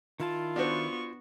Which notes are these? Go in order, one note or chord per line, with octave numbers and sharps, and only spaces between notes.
D#3 E4 F4 A5
B3 D4 F#4 C5 C#6